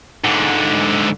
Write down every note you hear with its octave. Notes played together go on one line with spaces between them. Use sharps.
G#2 D3